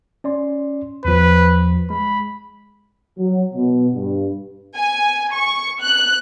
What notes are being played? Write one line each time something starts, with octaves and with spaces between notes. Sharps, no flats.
C#4 D5 C6
E2 F3 B4
G#3 B5
F#3
B2
G2
G#5
C#6
F#6